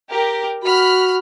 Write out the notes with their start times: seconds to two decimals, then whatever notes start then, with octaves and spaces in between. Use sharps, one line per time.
0.11 G4 A#4
0.63 F#4 B5 F6